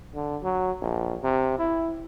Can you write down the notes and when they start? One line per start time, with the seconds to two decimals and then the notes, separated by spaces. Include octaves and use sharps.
0.14 D3
0.42 F#3
0.81 A#1
1.23 C3
1.58 E4